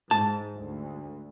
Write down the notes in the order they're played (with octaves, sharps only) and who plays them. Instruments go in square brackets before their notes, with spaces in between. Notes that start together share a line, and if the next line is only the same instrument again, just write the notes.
[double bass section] G#2 [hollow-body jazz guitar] A5
[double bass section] D2